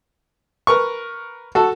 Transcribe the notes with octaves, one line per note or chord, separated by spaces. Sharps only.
A#4 B4 C#6
F#4 A4